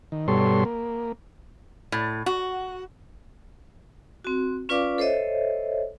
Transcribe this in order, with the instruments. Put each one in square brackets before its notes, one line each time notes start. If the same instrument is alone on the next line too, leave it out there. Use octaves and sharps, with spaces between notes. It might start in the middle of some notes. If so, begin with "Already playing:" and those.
[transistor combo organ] D#3
G2 B2 G3 A4 C#5 C6
A#3
[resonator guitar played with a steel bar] A2
F#4
[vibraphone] C4 F#4
C#4 F4 B4 D5 F5 D6
A4 C5 C#5 D#5 E5